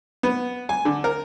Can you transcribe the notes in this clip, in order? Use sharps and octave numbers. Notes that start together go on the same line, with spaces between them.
B3
G#5
D3
A#4